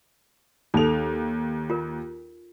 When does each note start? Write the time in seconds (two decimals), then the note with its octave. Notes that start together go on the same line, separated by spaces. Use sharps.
0.74 D#2 D#4 A4 F7
1.70 F4 A#4